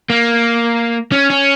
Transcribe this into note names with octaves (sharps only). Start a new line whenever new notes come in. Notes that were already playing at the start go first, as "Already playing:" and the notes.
A#3
C#4
C#4